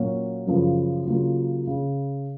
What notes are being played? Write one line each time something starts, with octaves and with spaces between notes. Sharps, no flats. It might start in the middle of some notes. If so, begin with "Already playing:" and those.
Already playing: A#2 F#3 A#3 C#4 F#4
F#2 C#3 F3
C#3 F#3 A#3 F4
C#3